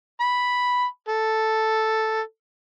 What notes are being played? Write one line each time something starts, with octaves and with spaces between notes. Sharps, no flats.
B5
A4